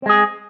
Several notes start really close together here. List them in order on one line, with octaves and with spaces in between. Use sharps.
C4 G#3 G#4